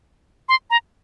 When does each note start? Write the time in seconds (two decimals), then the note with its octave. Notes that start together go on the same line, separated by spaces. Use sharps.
0.49 C6
0.70 A#5